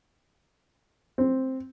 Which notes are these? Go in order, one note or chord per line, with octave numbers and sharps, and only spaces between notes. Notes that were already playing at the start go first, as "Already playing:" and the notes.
C4